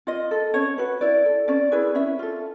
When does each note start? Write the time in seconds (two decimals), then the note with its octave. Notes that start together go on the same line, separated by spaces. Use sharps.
0.07 F4 D#5
0.31 A4
0.54 C#4 C#5
0.78 F#4 B4
1.01 E4 D5
1.25 A4
1.48 C#4 D5
1.72 E4 G#4 B4
1.95 C#4 E5
2.19 F4 A4